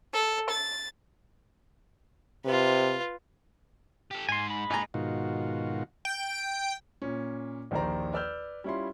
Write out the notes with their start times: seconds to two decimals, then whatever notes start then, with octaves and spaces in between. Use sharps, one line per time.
0.14 A4
0.50 A6
2.45 C3 F4 B4
4.11 G4 A4
4.29 G#2 G#5 C6
4.47 G#3 B5
4.70 G#2 D#4 G#4 A#5
4.94 G#2 B2 D#3 F4 F#4
6.05 G5
7.02 A#2 C#4
7.71 A#1 D#2 D#3 C5 D5 A#5
8.13 B4 D5 E6 F6 G6
8.64 G3 C#4 E4 F4 C6